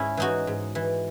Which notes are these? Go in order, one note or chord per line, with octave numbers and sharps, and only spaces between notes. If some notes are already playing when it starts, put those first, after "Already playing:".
Already playing: G#2 C#4 E4
E3 D#4 F#4
G#2
E3